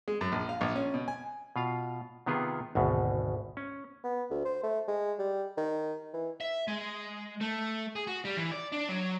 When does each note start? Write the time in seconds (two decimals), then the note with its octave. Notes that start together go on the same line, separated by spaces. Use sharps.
0.08 G#3
0.21 F#2
0.32 A#1
0.49 F5
0.61 A#1
0.76 C#4
0.94 B2
1.08 G#5
1.56 B2 F4 F5
2.26 C3 D#3 B3 F4 G#4
2.75 G#1 D2 B2
3.57 C#4
4.04 B3
4.31 D2
4.45 C5
4.63 A3
4.88 G#3
5.19 G3
5.57 D#3
6.14 E3
6.40 E5
6.68 G#3
7.41 A3
7.96 G#4
8.07 F#4
8.25 G3
8.37 E3
8.51 D5
8.72 D4
8.89 F#3